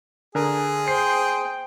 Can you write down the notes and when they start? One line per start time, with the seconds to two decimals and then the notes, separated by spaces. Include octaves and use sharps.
0.35 D3 G#4 A#4
0.88 C5 G5 C7